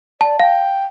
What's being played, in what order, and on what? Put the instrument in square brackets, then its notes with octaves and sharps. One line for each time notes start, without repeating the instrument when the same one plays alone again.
[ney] D5 [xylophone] A5
[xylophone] F5 [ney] G5